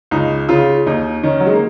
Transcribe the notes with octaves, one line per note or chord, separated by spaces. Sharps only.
C#2 D#4
C#3 F4
D#2 D#4
D#3 C#4
F#3
G#3
A#3